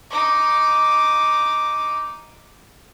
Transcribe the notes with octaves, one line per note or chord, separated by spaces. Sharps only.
D#4 D6